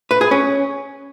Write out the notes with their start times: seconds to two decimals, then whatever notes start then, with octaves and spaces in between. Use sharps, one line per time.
0.11 B4
0.21 G#4
0.31 C#4